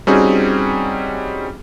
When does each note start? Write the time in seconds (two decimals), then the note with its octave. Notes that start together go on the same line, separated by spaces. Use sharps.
0.07 G3 C4 C#4 D#4 F#4 G#4